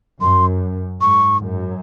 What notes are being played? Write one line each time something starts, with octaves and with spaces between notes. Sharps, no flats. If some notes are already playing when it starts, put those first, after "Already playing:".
F#2 C6
G#2 C#6
F#2